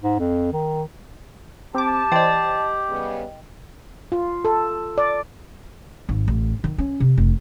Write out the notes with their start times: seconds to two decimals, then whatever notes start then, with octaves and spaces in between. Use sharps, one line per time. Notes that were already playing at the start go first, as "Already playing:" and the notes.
0.03 G#2
0.19 F2
0.52 D#3
1.75 C4 G4 A5 D6
2.12 E3 C5 D5 D#5 G5
2.89 C#3 G3 B3
4.12 F4
4.45 A4
4.98 D5
6.09 G#1
6.28 A1
6.64 D#3
6.78 C#4
7.00 C3
7.17 F1